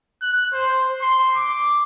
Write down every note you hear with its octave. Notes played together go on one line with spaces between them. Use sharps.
F#6
C5
C6
D6